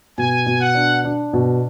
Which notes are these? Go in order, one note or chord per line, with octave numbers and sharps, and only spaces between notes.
B2 G#5
B2
F#5
D4
D4
B2